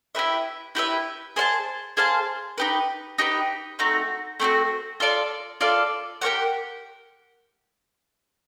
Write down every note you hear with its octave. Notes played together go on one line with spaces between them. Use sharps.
E4 G4 B4 E5
E4 G4 B4 E5
G#4 C5 F5 A5
G#4 C5 F5 A5
D#4 G4 B4
D#4 G4 B4
A3 C4 D#4 F#4
A3 C4 D#4 F#4
F4 A4 D5 F5
F4 A4 D5 F5
G4 A#4 C#5 F#5